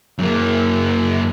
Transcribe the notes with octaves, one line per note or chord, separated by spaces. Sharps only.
F#2 A#3